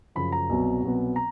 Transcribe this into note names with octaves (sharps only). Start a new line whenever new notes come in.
F#2 C#3 F3 B5
A#5
C2 B2 F#3 B3
C2 B2 F#3 B3
A#5